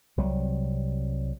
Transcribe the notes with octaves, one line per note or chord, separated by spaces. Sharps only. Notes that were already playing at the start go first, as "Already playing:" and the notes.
C2 C3 F#3 G3